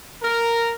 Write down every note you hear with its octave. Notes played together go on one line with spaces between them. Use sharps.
A#4